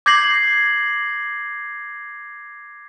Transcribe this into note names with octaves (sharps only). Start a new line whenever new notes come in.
D6 G6 G#6 A#6 C7 F#7